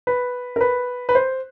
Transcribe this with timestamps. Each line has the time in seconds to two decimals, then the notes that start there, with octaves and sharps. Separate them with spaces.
0.07 B4
0.56 A#4
0.61 B4
1.09 B4
1.15 C5